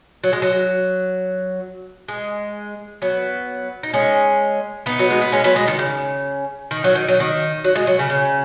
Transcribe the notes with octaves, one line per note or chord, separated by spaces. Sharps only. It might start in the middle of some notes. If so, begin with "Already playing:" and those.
F#3
G#3
F#3
G#3
F#3 B3
D#4
G#3 C#4
B3 D#4
F#3
G#3
B3
G#3 C#4
F#3 B3
G#3
D#3
C#3
D#3
F#3
D#3
F#3
D#3
F#3
G#3
F#3
C#3
C#3